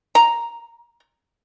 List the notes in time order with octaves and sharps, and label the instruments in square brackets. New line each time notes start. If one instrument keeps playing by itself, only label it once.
[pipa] A#5